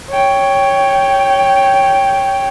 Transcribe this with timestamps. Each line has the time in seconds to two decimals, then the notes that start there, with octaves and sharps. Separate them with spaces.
0.10 C#5 G5